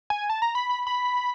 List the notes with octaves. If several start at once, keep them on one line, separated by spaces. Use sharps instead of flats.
G#5
A5
A#5
B5
B5
B5